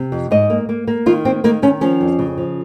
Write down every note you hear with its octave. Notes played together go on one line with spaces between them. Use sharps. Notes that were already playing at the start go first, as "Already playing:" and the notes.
Already playing: C3
F2
G#2 D#5
A#3
A#3
A#3
D#3 F4
A#3 C4
D#3 A#3
D#3 C#4
F3 C#4
F2
C#3
F3